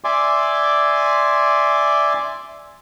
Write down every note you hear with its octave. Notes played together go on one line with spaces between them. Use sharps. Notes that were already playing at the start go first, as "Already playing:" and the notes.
D5 E5 G#5 C6 D6